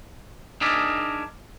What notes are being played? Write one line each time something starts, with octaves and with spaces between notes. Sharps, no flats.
D4 D#4 G#4 A#4 D5 E5